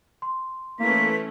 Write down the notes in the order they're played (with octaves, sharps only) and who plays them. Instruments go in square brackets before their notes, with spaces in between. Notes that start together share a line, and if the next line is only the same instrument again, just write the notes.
[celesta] C6
[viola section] E3 A3 C#4 [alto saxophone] A#3 [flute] B6